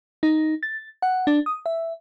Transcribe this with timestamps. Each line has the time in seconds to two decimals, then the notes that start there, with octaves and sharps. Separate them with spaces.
0.23 D#4
0.63 A6
1.02 F#5
1.27 D4
1.46 D#6
1.66 E5